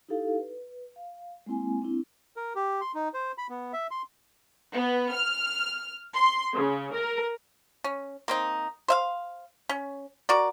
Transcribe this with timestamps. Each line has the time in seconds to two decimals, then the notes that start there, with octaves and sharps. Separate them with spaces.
0.09 D#4 E4 G4 A4 F5
0.40 B4
0.96 F5
1.46 G#3 A#3 C4 E4 G#5
1.82 C4 D4 E4
2.37 A#4
2.56 G4
2.81 C6
2.95 D#4
3.14 C5
3.38 B5
3.50 B3
3.73 E5
3.91 C6
4.74 B3
5.12 F6
6.14 C6
6.55 C#3
6.96 A#4
7.84 C#4
8.28 A#3 C4 D#4
8.88 C5 E5 F5
9.69 C#4
10.29 F#4 A#4 D5